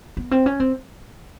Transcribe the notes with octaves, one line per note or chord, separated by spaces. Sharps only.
B3
C4
C#4
C4